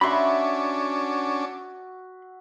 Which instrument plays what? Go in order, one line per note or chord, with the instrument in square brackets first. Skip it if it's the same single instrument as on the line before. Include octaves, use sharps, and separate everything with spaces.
[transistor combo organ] C#4 D4 [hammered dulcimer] F#4 E5 [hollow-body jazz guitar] B5 C6